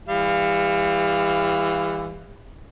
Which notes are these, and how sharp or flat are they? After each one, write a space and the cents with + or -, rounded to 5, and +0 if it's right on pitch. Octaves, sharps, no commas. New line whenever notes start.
E3 +0 G3 +40 F5 +0